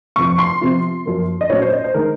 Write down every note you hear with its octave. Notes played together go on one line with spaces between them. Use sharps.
F2 C3 F3 C#6
C6
C3 F3 C4 F4
F#2 F3 A#3
D#5
A#2 F#3 C#4 F4 C#5
C5
D#5
C5
D#3 G#3 D#4 A#4